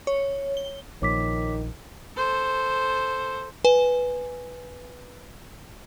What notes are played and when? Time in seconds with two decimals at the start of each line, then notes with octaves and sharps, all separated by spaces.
0.07 C#5
0.57 G7
1.02 A#1 A#2 D#3 F3 C#5 D6 B6
2.17 A4 C5
3.64 B4 G#5